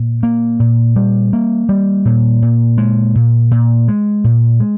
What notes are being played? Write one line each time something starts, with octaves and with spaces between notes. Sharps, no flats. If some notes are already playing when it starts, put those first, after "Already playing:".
Already playing: A#2
A#3
A#2
G3
A#3
G3
A#2
A#2
G#3
A#2
A#2
G#3
A#2
G#3